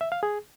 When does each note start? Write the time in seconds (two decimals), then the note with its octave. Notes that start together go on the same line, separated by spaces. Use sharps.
0.01 E5
0.12 F5
0.23 G#4